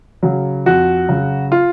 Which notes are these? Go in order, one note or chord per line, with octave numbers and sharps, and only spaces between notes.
C#3 F#3
F2 F#4
C#3 F#3
F4